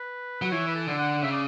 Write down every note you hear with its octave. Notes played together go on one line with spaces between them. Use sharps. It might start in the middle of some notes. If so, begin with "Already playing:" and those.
Already playing: B4
F#3
E3 C#5
B4
A4
D3
F#5
C#3 E5
D5